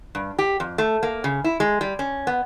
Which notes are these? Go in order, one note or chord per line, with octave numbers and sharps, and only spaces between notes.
G2
G4
F2
A3
A#3
C#3
E4
G#3
G3
C#4
B3